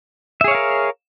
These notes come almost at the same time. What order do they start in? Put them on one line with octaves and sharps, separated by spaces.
E5 G#4 C#5 F5 A#4